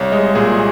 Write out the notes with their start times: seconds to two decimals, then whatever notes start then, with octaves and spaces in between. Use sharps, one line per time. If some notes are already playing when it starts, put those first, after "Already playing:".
Already playing: C2 C#5
0.12 G#3 D#5
0.35 A#2 G#4